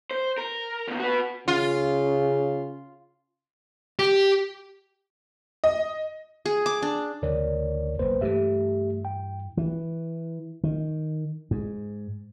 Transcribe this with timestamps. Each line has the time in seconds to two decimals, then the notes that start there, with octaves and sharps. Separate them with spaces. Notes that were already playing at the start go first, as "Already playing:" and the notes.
0.11 C5
0.38 A#4
0.88 E2 A#2
1.00 F#4 B4
1.48 C#3 F4
3.99 G4
5.64 D#5
6.46 G#4
6.66 D6
6.82 D4
7.23 D2 C#3 E3 A#4 C#5 D5
7.99 F#1 B1 A#3 B4 C5
8.21 G2 E3 A3 G4 E5
9.05 G5
9.57 E3
10.64 D#3
11.51 G#2